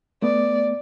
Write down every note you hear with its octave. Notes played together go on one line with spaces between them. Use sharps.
A3 B3 D5